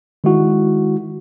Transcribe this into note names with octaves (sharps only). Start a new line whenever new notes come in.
D#3 G#3 E4 F#4